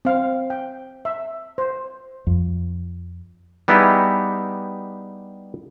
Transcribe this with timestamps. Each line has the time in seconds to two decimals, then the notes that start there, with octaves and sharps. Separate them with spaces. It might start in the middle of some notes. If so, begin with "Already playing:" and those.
0.05 C4 F5
0.50 G5
1.05 E5
1.58 C5
2.27 F2
3.68 G3 B3 D#4 E4 G4 G#4